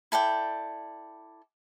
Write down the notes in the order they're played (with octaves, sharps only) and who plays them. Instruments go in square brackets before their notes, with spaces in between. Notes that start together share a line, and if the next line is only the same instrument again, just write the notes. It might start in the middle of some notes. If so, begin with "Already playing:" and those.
[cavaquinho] E4 A4 D5 G5